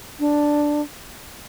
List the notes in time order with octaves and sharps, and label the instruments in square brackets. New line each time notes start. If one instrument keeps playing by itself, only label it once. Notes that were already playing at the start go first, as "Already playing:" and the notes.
[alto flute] D4